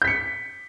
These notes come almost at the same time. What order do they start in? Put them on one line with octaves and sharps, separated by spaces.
G6 B6 C#7